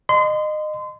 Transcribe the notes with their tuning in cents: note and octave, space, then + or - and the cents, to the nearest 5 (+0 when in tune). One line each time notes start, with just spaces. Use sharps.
D#5 -25 C6 -30